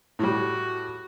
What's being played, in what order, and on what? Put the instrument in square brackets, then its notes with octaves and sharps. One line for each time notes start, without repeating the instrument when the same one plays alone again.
[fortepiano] A2 G3 [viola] F#4